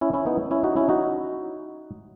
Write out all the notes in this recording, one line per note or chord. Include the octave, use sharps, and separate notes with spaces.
C#4 E4
C#4 E4
B3 D#4
C#4 E4
D#4 F#4
C#4 E4
D#4 F#4